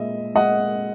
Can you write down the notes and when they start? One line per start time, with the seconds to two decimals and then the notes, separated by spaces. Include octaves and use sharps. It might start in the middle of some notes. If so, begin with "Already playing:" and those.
Already playing: A#2 G#3 D#5 E5
0.35 G#3 D#5 F#5